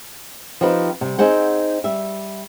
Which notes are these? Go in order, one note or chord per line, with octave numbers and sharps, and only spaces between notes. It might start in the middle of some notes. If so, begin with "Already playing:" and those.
F3 C4 D#4 G4 B4
C3 G3
C4 D#4 G#4 C5 F#5
G3 E5